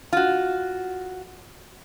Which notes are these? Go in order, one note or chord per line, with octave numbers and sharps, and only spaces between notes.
F4 F#4